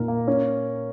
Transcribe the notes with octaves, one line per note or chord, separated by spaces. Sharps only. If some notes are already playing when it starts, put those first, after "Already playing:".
Already playing: A#2 D#4 A#4
A#3
C#4